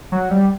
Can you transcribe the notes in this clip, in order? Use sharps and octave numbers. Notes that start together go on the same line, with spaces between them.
F#3
G3